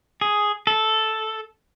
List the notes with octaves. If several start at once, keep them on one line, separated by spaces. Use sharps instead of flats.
G#4
A4